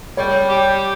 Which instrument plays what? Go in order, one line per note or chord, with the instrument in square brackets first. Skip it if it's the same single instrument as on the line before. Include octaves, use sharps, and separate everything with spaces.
[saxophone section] G3 [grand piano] C#5
[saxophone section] G4